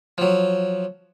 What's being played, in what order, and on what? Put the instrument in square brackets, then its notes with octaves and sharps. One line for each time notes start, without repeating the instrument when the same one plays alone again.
[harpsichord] F3 F#3